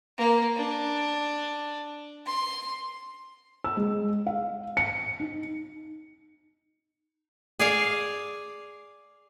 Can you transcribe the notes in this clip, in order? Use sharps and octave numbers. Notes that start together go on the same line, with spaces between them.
A#3
D4
C6
E6
G#3
F5
C#7
D#4
G#4 D5 F5